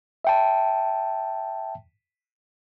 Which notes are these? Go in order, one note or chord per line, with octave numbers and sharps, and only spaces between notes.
E5 G5 A5